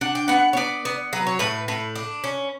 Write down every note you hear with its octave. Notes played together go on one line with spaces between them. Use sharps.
D4 F#5
G5
B3 F#5
C#5
B3 D5
B3
F#3 B4
C#5
A2 B4
A2 B4
D4
C#4